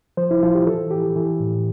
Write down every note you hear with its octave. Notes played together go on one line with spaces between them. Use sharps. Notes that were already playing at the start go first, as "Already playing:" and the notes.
F3 C5
E4
F3 F4
G4
E3 A4
E3 G4
E3
A2